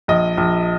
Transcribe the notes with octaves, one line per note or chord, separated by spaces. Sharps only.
A#1 D#5
A#1